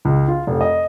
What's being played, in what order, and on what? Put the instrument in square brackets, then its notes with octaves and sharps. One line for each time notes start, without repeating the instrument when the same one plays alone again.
[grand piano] C#2
F4
F1
D#5